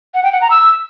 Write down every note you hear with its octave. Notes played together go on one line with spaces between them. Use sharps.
F#5
G5
F#5
A#5
E6